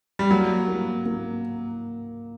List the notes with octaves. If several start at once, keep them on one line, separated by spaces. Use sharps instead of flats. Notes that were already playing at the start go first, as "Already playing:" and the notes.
G3
F#3 A#3
A#3
A#3